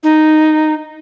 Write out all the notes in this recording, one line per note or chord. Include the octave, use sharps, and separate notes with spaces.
D#4